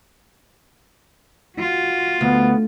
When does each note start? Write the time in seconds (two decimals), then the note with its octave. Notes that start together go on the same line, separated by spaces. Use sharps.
1.59 F4 F#4
2.21 D2 B3